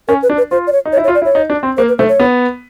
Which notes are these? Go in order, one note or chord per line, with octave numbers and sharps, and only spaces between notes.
C#4 A#4
B4
D4
B4
F4 C5
D5
C#5
D#4
C#5
E4
C#5
F4
D5
E4
C#5
D#4
D4
C4
A#3 C5
B4
A3 C5
C#5
B3